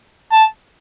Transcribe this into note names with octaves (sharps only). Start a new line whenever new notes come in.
A5